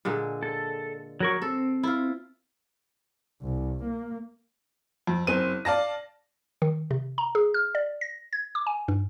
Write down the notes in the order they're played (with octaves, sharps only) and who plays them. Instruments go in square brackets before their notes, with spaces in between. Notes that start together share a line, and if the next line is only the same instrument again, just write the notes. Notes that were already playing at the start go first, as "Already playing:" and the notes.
[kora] A#2 D3 G#3
[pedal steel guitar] A4
F#3 A#4 C#6
[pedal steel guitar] C4 [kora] A4
[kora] E4 F4
[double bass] C2
A#3
[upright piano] F2
F#1 C4 D#7
D5 F5 A5 A#6
[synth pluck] D#3
C3
A#5
G#4
F6
D5
A#6
G#6
D6
G#5
G2